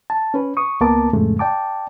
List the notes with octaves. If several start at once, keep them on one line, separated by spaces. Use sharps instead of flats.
A5
C#4 B4
C#6 D#6
C#2 A#3 B3 A#4 A5 D6
F2 A2 C#3 G#3 A3
D5 G5 A5 D6